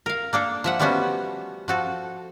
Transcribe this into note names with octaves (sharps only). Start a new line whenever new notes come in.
A#4 F5
A#3 D4 A4
F3 E5 F#5
F3 G3 A3 B3 C#4 F#4
F3 F#4 A4